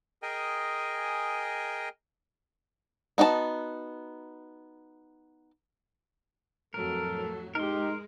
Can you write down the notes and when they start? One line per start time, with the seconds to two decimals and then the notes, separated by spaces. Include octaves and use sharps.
0.23 G#4 A#4 D#5 G5 G#5
3.18 B3 D#4 F#4 D5 A5
6.74 F2 A2 F#3 A4 A#4
7.55 G#3 D#4 G4 A#4 C6